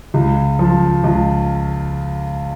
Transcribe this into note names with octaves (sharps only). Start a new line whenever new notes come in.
C#2
F3
C#2